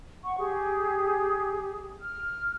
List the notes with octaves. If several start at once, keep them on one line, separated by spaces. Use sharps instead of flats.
F#5 C#6
G4 G#4
F6